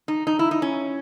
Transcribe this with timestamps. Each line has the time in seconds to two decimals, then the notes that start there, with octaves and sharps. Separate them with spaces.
0.08 D#4
0.27 D#4
0.39 E4
0.51 D#4
0.62 C#4